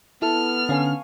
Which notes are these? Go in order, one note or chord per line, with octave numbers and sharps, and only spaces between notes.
B3 E4 A4 F6
D3 C#4 F5 G#5 C#6